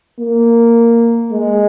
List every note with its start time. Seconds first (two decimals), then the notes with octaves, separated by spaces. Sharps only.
0.19 A#3
1.32 G#3